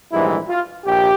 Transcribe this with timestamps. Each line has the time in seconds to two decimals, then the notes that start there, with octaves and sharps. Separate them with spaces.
0.11 A#1 G#2 E3 G3 E4
0.49 F4
0.86 A#1 G4